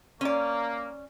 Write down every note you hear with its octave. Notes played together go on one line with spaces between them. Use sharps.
A#3 C#4 D5